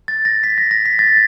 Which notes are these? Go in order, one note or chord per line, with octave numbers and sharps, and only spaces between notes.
A6
A#6
B6
A#6
A#6
B6
A6